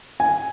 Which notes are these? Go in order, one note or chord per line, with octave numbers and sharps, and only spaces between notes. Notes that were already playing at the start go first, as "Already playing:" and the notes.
G#5